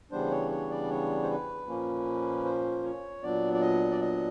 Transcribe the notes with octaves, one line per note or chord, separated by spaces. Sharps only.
C#3 E3 G3 B3 D4 C5
C#5
C#5
D5
C#5
C5
B4
A#2 F3 A#3 C#4
C5
C#5
A#2 F#3 B3 D4 D5
D5
D#5
D5
D#5